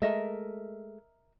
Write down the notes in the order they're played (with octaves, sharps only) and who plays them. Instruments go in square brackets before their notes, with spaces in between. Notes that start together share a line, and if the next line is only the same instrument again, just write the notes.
[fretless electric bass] G#3 A3 [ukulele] A#4 D#5 E5